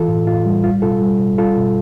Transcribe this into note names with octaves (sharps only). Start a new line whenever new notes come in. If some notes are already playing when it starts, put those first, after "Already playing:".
Already playing: E3 F4 A4
A2
A2 F4
G3
G3 F4
B2 F4 A4
G3
B2
G3 F4 A4
B2